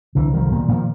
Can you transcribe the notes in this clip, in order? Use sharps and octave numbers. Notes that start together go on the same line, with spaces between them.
C2 D3 E3
C2 D#3 F3
D3
A#2 D#3
A#2 D#3 F3